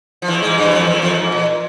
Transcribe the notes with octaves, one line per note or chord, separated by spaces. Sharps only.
F3
E2 E3
G#2 G#3
G2 G3
E3
F2 F3
E2 E3
F2 F3
G#2
A#2